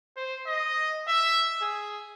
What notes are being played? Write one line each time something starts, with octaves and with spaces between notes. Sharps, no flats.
C5
D#5
E5
G#4